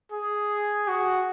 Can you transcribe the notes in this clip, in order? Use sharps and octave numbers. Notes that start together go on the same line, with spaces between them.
G#4
F#4